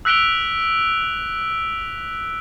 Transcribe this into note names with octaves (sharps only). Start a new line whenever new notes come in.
E6 F#6 B6 D7 F7 G7